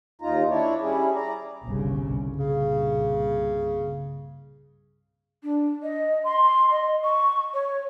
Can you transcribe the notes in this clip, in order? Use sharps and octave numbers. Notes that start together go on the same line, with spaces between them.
D#2 D#4 F4 A#5
D4 E4 C#5 D5
G3 C#4 E4 G#4
D5 A#5
G1 C2 C#3
C2 G2 A#2 C#3
D4
D#5
C6
D#5
C#6
C#5